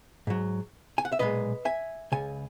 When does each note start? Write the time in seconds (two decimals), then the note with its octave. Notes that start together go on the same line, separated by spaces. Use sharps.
0.27 G#2 F#3
0.98 G#5
1.05 F#5
1.12 E5
1.19 B1 A#2 G#3 B4 D#5
1.65 E5 G#5
2.12 C#2 C#3 G#5